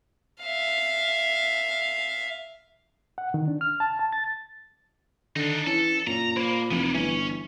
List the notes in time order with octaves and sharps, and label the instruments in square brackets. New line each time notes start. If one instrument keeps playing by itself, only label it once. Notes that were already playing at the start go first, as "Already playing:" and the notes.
[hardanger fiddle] E5 F5
[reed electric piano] F#5
D#3
D4
F6
A5
A5
A6
[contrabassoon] D3 [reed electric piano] D#3 [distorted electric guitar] D4 D#4
[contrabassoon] E3 [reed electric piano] C#4 [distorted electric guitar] A4
[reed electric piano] F#2 C#4 [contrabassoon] A#2 [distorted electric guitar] A#5
[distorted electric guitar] A#3 [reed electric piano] C5 B5
[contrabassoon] F1 [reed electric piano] E3 F3 [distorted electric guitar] A#3 B3
[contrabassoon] G1 [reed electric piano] E3 [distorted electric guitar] C#4